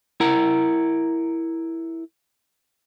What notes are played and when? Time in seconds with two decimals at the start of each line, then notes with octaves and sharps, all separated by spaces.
0.20 E4 A#4 F#5 A#5